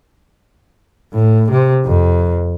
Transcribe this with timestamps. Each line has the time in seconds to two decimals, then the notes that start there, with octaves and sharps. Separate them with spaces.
1.14 A2
1.51 C3
1.85 F2